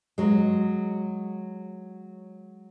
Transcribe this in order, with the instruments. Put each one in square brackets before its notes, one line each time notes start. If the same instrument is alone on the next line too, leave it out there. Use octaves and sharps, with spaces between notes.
[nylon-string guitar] F#3 G#3